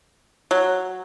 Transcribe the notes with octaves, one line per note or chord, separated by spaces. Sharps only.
F#3